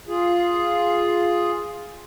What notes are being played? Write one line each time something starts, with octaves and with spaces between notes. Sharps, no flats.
F4 G#4